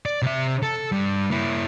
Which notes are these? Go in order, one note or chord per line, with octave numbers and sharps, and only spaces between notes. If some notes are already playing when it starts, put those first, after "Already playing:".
D5
C3 E5
A4
G2 G3
A#3 E4